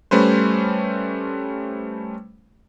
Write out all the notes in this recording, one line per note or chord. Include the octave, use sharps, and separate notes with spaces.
G3 A3 C#4 B4 C5